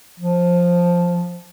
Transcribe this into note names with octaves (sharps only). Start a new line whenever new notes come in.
F3